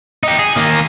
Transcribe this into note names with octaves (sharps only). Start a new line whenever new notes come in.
D#4 G4
G#4
D#3 A#3